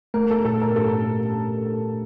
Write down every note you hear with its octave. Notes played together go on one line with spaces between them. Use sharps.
A3 A#4
A4
A#2 A4
A#4
G4 A4